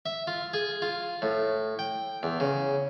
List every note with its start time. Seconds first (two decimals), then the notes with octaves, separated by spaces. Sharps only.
0.06 E5
0.27 F4
0.53 G#4
0.82 F4
1.22 A2
1.79 G5
2.23 E2
2.40 C#3